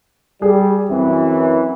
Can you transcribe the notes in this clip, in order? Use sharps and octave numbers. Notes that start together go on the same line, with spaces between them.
G3 G#4
F#2 E3 C4